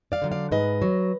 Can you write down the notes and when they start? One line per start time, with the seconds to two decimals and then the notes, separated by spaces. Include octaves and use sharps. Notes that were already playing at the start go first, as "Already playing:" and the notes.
0.12 D5 F5
0.22 D3 F#3
0.32 D5 F5
0.52 G#2 B4 D#5
0.82 F#3